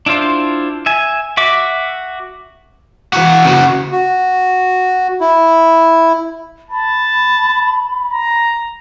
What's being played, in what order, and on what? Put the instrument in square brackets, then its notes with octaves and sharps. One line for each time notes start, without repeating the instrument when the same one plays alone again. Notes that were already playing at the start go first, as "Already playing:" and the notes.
[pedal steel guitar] D4 E4 F4 C5
E5 G#5
F#4 E5 D6
[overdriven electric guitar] E3 F#4
C#3 F#4
[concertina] F#4
E4
[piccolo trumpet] A5 [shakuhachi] B5
[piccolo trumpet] A#5